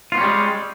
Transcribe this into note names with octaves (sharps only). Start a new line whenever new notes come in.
G3 G#3 B3 C#4 F4